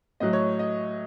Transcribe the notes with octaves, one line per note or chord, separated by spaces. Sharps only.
A2 F#3 D#5
C#5
D#5